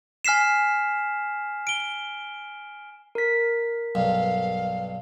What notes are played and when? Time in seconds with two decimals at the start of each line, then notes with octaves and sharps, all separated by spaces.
0.25 G#5 F6 B6 C7 E7
1.67 D7 G7
3.15 A#4 B6
3.95 B1 G2 F5